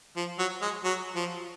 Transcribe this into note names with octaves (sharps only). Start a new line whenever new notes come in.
F3
F#3
G#3
F#3
F3